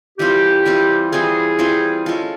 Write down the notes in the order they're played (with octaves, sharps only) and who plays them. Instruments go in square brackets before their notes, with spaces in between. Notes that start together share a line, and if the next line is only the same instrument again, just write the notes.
[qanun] E3 G3 C4 F4 [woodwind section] G4
[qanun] E3 G3 C4 F4
[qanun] E3 G3 C4 F4 [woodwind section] G#4
[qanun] E3 G3 C4 F4
G#3 C#4 F4 A4